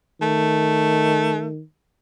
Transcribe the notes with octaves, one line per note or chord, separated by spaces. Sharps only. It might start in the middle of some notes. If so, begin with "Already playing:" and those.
D#3 A3